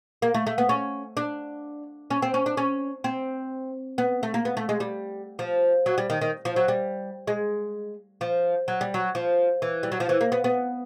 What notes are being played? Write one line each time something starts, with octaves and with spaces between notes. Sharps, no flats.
A#3
A3
A3
B3
C#4
D4
C#4
C4
C#4
D4
C#4
C4
B3
A3
A#3
B3
A3
G#3
G3
F3
F#3
G3
D#3
D#3
F3
F#3
G3
G#3
F3
F#3
G3
F#3
F3
E3
G3
F#3
F3
E3
A#3
B3
B3